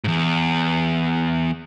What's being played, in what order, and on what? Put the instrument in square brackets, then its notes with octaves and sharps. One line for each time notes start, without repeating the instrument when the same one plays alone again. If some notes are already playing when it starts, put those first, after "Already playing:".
[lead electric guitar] E2 G#2